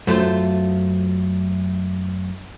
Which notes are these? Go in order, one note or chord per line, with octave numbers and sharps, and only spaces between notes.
F#2 A3 F4 C5